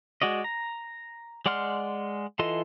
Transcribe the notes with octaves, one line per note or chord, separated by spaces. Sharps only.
G#3 F#4 D5 D#5
A#5
G#3 D5 F#5 C6 F6
E3 F4 A4 D#5 C6